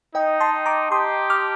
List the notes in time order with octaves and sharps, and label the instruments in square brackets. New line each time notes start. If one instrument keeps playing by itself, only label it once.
[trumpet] D#4 [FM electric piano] D#5 G5
[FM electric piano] A5 C6
A#5 D6
[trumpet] G4 [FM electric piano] C6 D#6
[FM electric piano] D6 F6